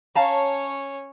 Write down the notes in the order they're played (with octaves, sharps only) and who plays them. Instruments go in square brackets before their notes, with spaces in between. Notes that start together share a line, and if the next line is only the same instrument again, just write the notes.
[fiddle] C#4 C#5 [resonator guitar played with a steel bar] F5 A5 A#5